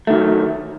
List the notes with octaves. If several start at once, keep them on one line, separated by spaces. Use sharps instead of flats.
D#3 F#3 A3